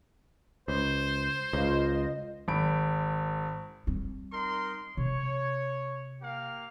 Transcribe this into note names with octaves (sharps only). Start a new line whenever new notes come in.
C#2 C5
C#2 F4 D#5
G#1 B5 D7
G3 C4
D#4 A#4 C6
C3 C#5
A#3 G4 F5